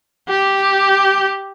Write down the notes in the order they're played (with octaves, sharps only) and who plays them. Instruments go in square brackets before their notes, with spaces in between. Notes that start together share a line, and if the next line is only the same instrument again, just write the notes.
[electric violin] G4